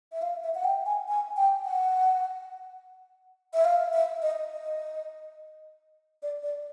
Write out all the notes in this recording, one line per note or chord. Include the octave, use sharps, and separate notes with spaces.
E5
F5
E5
F#5
G5
G#5
G#5
G5
F#5
E5
F5
E5
D#5
D#5
D5
D5